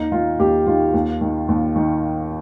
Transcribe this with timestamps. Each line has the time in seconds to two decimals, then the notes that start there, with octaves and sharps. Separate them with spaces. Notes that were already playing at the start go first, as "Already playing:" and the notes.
Already playing: D#2 D#4
0.12 D#3 F4
0.39 D#2 G4
0.66 D#3 F4
0.93 D#2
1.21 D#3
1.48 D#2
1.76 D#3